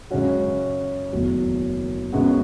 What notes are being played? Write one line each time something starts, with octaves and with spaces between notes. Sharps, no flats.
F#2 C#3 G#3 C#4 F#4
F#1 E2 D#3 F#3 A3
F#2 C#3 G#3 B3 F#4